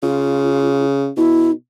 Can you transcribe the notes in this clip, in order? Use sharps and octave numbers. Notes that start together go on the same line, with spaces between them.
C#3 F4
B2 E4